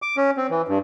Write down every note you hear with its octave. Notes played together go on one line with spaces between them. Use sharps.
D6
C#4
C4
E3
G2